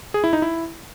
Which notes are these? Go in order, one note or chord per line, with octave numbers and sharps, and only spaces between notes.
G#4
E4
D#4
E4